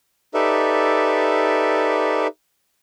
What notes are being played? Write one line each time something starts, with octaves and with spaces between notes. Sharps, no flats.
D#4 G4 A4 B4 D5 E5